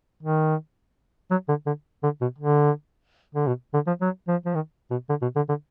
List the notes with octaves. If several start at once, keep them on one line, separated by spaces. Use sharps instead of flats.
D#3
F#3
D3
D3
D3
B2
D3
D3
B2
D3
F3
F#3
F3
F3
D#3
B2
D3
B2
D3
D3